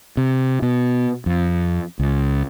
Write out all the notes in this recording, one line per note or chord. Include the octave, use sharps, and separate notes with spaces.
C3
B2
F2
C#2